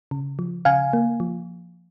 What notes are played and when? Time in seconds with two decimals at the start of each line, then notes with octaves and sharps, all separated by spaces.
0.11 C#3
0.39 F3
0.65 C#3 F5 G#5
0.93 A#3
1.20 F3